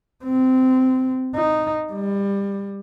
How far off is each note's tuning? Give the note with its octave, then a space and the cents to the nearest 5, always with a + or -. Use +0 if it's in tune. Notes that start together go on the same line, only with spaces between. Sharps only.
C4 -15
D#4 -5
G3 +25